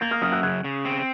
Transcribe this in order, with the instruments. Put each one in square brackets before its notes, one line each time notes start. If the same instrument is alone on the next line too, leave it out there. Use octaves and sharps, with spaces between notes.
[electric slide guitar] A#3 [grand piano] G6 A6
[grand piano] D#6 F6
[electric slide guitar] F#2 [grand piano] D#6 F6
[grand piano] E6 F#6
[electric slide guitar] C#3 [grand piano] F#6 G#6
[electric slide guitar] C#3
C4